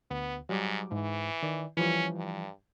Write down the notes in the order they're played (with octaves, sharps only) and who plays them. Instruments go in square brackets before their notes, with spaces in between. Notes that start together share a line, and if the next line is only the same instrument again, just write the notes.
[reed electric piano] D2 [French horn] B3
[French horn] G#2 [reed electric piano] F#3 G3 D6
[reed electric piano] G#2 [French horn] E3
[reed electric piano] D#3 D5
[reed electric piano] E3 F3 G3 [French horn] C#4
[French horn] G2